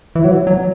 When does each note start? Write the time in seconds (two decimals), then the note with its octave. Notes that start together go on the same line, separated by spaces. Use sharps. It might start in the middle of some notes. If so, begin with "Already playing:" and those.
0.15 E3
0.24 F#3
0.47 F#3